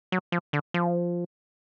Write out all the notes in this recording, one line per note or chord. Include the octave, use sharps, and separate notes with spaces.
F#3
F3
D3
F3